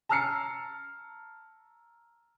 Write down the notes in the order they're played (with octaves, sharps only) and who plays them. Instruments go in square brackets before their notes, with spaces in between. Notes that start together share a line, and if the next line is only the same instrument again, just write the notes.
[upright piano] A5 A#5 E6 F6 C7 C#7